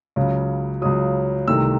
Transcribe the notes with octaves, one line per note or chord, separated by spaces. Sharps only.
C#2 C#3 F#3
C#2 C#3 F#3 D#6
C2 C3 D#3 A3 E6